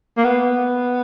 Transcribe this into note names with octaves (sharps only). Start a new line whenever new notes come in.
A#3
B3